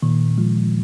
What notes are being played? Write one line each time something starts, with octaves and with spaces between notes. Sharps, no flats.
A#2 D#3
F3 G#3